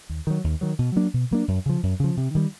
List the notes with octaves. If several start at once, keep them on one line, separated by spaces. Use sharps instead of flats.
D#2
D#3 F#3
D#2
D#3 F#3
B2
F#3 A#3 D4
B2
F#3 A#3 D4
F#2
C#3 F3
F#2
C#3 F3
C3
D#3 G3